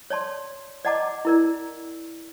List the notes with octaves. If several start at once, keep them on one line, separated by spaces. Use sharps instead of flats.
C#5 D5 A5 C6
D5 D#5 F#5 A5 A#5 D6
E4 A#4 D5